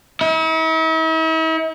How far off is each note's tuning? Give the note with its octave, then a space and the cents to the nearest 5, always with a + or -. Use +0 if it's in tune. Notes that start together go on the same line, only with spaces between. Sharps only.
E4 -45